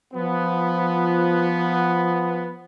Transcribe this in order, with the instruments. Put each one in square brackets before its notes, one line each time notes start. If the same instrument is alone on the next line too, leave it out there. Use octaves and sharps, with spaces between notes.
[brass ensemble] F3 B3